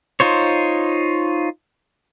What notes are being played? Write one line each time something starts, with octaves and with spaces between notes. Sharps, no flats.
D#4 F4 C5 C#5